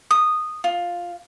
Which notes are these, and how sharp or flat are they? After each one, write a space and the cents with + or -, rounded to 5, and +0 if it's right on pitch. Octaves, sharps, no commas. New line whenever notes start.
D#6 -10
F4 +5